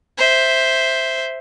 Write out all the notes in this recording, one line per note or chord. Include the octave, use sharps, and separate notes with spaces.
C5 E5